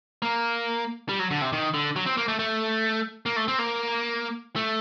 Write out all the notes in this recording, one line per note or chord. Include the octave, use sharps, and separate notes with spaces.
A#3
G3
F#3
D3
C3
D#3
D3
F#3
C4
A#3
A3
A3
A#3
A3
C4
A#3
A3